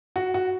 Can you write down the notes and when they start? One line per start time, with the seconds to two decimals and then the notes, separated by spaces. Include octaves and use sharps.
0.16 F#4
0.34 F#4